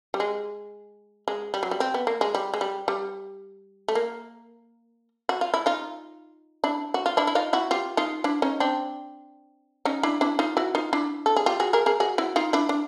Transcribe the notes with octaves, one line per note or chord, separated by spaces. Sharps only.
G3
G#3
G#3
G3
F#3
G3
C4
B3
A#3
G#3
G3
G#3
G3
G3
A3
A#3
F#4
F4
E4
D#4 F4
D4 E4
F#4
F4
D4 E4
E4
D#4 F4
E4 F#4
F4 G4
D#4 F4
D4 E4
C#4 D#4
C4 D4
C#4 D#4
D4 E4
D4 E4
D#4 F4
E4 F#4
D#4 F4
D4 E4
A4
G#4
F4 G4
F#4 G#4
G#4 A#4
G#4 A#4
F#4 G#4
E4 F#4
D#4 F4
D4 E4
D4